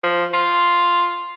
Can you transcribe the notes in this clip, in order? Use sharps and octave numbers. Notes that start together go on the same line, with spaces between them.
F3
F4